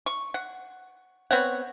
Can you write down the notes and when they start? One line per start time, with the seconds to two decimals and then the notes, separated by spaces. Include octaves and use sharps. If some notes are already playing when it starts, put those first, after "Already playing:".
0.06 C#6
0.34 F#5
1.31 B3 C4 C#5 F#5